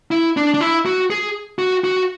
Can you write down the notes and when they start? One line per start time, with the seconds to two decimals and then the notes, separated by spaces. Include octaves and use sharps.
0.11 E4
0.37 D4
0.54 D4
0.61 E4
0.86 F#4
1.10 G#4
1.59 F#4
1.84 F#4